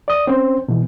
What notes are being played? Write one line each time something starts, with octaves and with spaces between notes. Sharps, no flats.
D5 D#6
C4 C#4 C5
B2 E3